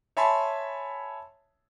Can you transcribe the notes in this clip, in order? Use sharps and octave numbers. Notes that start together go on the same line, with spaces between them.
C#5 E5 G#5 A5 B5 C6